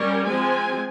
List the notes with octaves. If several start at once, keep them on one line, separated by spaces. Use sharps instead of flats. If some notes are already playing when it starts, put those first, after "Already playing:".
Already playing: G3 C#4 A#4
F3 G#3 C4 G#5